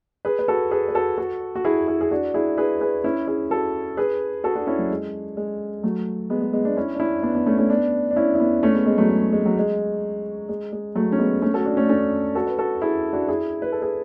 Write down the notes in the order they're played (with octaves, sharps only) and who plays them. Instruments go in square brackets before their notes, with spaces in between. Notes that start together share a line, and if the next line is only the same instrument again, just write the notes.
[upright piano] G#4 B4
B4
F#4 A4
G#4 B4
B4
F#4 A4
F#4 A4
F#4
E4 G#4
E4 G#4
G#4
D4 F#4
E4 G#4
G#4 B4
G#4 B4
C#4 E4
E4 G#4
F#4 A4
G#4 B4
F#4 A4
D4 F#4
C#4 E4
F#3
G#3
G#3
F#3 A3
G#3 B3
G#3
G#3 B3
B3 D4
C#4 E4
D4
C#4 E4
B3 D4
B3 D4
A3 C#4
A3 C#4
B3 D4
D4
C#4 E4
E4
B3 D4
A3 C#4
G#3 B3
G#3 B3
F#3 A3
G#3
G#3
F#3
G#3
G#3
G#3
F#3 A3
C#4
G#3 B3
A3 C#4
F#4 A4
D4 F#4
A3 C#4
D4
A3 C#4
F#4 A4
B4
F#4 A4
E4 G#4
D4 F#4
E4 G#4
B4
A4
G#4 B4